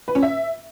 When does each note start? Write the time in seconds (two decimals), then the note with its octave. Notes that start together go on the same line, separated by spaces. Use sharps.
0.08 B4
0.15 C#4
0.23 E5